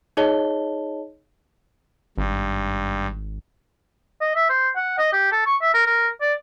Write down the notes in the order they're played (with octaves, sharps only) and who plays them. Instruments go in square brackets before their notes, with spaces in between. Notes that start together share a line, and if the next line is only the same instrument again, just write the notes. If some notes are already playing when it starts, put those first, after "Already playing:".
[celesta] D#4 G#4 C#5 D#5 A5 G7
[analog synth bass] G#1 [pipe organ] G2
[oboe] D#5
E5
C5
F#5
D#5
G4
A4
C#6
E5
A#4
A#4
D5